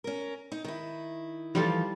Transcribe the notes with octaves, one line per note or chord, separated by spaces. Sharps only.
C#4 A#4
D#4
D#3 E4
E3 F3 G3 F4 A4